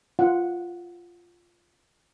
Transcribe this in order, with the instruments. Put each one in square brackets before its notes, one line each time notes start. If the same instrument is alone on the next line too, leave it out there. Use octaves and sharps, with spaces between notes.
[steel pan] F4 F#5